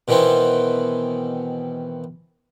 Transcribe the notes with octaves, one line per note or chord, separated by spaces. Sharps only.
B2 D#3 E3 B3 C4